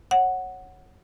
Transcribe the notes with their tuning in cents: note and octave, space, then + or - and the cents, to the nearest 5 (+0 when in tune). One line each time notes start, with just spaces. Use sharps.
C#5 -20 F#5 +0